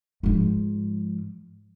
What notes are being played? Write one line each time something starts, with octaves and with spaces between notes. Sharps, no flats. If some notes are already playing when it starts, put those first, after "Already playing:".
G#2 F3